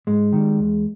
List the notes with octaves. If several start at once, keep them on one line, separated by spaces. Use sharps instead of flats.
G#2 G#3
D#3 G3
E2